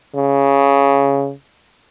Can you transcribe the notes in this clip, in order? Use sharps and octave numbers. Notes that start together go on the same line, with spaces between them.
C#3